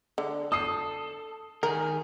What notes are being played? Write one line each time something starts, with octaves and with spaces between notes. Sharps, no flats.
D3
A4 D#6 C7
D#3 G#4 A#4